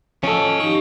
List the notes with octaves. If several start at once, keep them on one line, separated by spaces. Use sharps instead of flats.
F3 C#4 A4 D#5 A5
D#4 G4 C#6